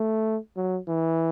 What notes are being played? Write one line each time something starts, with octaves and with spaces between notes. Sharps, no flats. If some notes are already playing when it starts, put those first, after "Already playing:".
Already playing: A3
F#3
E3